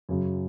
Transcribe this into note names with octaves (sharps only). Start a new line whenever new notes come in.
F#2 C#3 F#3